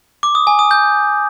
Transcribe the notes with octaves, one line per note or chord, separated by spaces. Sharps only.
D6
D#6
G#5
D#6
G6